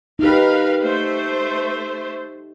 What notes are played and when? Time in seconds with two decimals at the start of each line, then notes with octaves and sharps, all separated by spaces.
0.19 D#4 G4 A#4 B4 F5
0.82 A3 C5